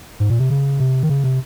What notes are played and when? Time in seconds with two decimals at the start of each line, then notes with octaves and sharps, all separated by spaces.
0.20 G#2
0.30 A#2
0.39 C3
0.50 C#3
0.80 C3
1.03 D#3
1.09 C#3
1.24 C3